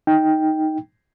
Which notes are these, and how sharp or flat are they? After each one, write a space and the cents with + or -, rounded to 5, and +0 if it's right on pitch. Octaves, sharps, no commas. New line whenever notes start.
D#4 +5 G5 +0